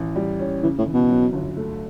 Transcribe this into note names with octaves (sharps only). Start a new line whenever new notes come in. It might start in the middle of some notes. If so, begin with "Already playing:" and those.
Already playing: A1
G3
C#4
C#3 E3
A2
E3
B2
F#3
G1
A3